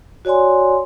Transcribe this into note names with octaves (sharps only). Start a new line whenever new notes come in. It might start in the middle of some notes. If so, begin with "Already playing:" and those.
F#4 C#5 D5 G#5 C6